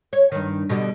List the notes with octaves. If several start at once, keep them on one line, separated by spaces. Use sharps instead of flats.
C#5
G2 D#3
B2 D3 G3